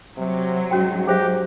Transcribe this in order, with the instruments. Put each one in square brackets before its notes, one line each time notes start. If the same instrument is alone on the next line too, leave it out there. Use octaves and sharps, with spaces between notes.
[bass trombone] C3 [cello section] F#3
[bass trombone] G#2 [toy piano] C#4 F#4 G5
[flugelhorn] G4 [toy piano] G#4 C5 E5